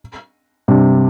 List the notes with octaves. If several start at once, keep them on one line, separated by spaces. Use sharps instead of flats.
G2 C3